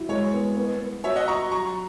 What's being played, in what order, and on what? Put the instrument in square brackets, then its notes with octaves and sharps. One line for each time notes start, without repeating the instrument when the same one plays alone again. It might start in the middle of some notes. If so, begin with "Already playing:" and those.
Already playing: [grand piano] F#3 E4
[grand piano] G#3 [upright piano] C#5
[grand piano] B3
B3
B3
[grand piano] F#4 [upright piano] C#5 E5
[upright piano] D#5 F#5
[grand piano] F#4 [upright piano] A#5 C#6
[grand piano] F#3 [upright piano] A#5 C#6